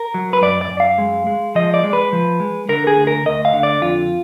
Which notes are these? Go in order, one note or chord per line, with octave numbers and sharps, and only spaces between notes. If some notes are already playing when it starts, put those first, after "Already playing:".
Already playing: A#4
F#3
B4
F#2 D5
D5
F#2
F5
G#3
G#3
F3 D#5
D5
G#3
B4
F3
G#3
D3 A#4
G#4
D2
A#4
D2 D#5
F5
D3
D5
F2 F4